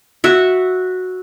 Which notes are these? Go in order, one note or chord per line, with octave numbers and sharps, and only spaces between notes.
F#4 E5